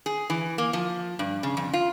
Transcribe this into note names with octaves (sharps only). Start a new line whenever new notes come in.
G#4
E3
A#3
F3
G2
C#3
F2
F4